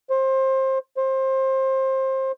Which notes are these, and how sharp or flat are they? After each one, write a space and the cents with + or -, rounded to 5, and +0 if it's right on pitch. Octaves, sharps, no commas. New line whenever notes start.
C5 +25
C5 +25